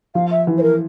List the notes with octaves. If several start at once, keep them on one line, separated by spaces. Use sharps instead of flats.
F3 F5
E5
E3
C5
A#4